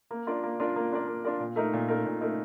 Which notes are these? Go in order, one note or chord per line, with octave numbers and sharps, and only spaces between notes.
A#3
D4 F4 A#4 D5
A#3
D4 F4 A#4 D5
A#3
D4 F4 A#4 D5
A#3
D4 F4 A#4 D5
A#2
A3 D#4 A#4
A#2
A3 D#4 A#4
A#2
A3 D#4 A#4